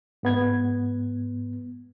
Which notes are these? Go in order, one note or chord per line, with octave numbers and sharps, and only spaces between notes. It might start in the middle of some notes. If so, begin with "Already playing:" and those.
G#2 B3 G#6